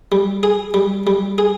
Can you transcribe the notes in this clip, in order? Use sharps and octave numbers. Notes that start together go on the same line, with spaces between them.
G3
G#4
G3
G3
G#4